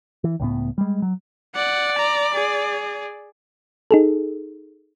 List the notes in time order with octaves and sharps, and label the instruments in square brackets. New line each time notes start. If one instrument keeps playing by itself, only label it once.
[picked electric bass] E3
C#2 A2 B3
G3 G#3
F#3
[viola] D5 [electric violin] F#5
[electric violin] A#5
G#4
[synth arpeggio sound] D#4 G#4 A4